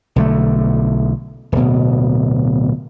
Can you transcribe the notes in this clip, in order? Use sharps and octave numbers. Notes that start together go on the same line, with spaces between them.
B1 D3 A3
D1 B2